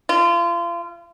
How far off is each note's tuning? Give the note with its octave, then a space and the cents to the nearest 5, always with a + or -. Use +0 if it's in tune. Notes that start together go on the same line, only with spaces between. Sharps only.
F4 -30